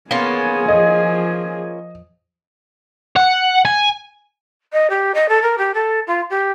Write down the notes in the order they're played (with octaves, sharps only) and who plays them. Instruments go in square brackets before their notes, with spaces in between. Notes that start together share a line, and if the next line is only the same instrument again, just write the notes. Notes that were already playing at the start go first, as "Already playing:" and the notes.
[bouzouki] A#3 C#4 F4 [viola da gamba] B3 [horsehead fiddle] G#4 G#5
[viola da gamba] F3 [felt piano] D#5
[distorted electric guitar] F#5
G#5
[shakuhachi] D#5
G4
D#5
A4
A#4
G4
A4
F4
G4